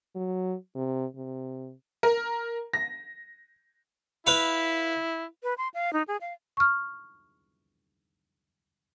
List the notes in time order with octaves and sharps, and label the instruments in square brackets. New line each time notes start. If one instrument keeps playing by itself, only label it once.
[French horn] F#3
C3
C3
[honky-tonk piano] A#4
A#6
[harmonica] E4 [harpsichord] B4 F5
[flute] B4
C6
F5
D#4
G#4
F5
[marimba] C#6 F6